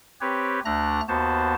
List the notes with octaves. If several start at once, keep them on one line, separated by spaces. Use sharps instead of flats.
C4 G4 B4 C#5
D2 A3 D4 A#5 F#6 A#6
D#2 B3 F#4 C5 A5